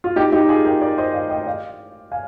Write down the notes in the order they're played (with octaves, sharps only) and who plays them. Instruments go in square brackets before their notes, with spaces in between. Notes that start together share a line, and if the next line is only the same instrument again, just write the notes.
[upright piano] F4
D#4 G4
D#4 G4
F4 G#4
G4 A#4
A#4 D5
C5 D#5
D5 F5
D#5 G5
D5 F5
F5 G#5